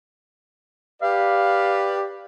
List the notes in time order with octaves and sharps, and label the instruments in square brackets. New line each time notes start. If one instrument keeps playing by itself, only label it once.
[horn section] G4 B4 D5 [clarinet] F5